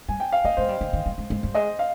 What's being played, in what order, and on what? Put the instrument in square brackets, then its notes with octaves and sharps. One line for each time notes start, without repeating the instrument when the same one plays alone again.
[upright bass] G3 [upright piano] G#5
[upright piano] G5
F5
[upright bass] A#3 [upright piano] D#5
[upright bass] G#3 [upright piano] C5
[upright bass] G3
D3
D#3
G3
G#3
G#3
G3
[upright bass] G#3 [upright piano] D#5
[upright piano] F5